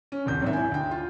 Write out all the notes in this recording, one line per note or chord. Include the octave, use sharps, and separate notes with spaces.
C#4
D#1 C2 G6
G#1 G#2 E5
E4 G#5
D2 G5
F4